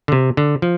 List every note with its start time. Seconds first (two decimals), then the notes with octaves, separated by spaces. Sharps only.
0.08 D3
0.12 C3
0.37 D3
0.62 F3